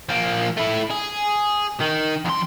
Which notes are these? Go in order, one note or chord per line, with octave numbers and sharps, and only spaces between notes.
F3 A#3
A3 E4
G#4
D#3
F2 C6